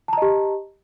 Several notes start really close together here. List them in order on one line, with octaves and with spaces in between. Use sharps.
A5 A#5 D#5 G4